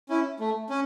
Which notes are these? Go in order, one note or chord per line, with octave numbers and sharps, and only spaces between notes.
C#4 E4
A3
C#4